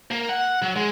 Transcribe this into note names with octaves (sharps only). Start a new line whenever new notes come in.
A#3
F#5
F#3
G#3